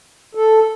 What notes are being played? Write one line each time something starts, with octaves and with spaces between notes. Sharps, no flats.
A4